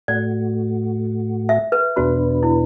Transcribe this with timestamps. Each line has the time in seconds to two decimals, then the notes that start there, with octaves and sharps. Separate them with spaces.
0.08 A2 A3 F#4 D5
1.49 E5
1.72 B4
1.96 E2 B2 B3 D4 F#4 B4
2.43 E4